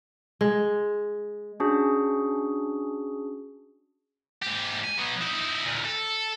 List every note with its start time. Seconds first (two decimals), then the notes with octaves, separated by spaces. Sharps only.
0.41 G#3
1.60 C#4 D4 F#4 G#4
4.42 G#2 G4
4.84 G#5
4.98 F#3 B3
5.21 D#4 E4
5.65 D2 A#2
5.85 A4